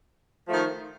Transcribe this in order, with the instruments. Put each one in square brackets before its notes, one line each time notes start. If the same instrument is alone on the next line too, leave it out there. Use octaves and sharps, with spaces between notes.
[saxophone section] F3
A3
D#3